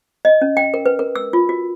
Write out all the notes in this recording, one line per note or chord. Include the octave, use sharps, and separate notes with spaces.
D#5
C#4
G5
A#4
B4
A#4
E6
F4
F#4